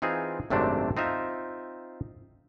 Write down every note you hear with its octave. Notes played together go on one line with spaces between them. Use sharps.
E3 C4 D#4 F4 G#4
G#1 F#2 C3 A3 C4 D4
C4 D#4 F4 E5